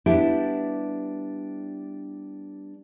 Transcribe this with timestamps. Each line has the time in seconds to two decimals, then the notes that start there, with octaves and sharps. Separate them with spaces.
0.06 G3 B3 D4 E4 G4